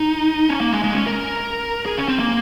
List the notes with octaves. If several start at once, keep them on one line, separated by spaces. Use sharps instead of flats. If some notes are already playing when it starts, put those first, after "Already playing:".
Already playing: D#4
C#4
A#3
G#3
G#3
C#4
A#4
G#4
C#4
C4
A#3